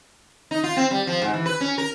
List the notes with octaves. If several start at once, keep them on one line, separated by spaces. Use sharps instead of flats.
D#4
F4
C4
G3
F3
G#2
E3
B4
C#4
A#4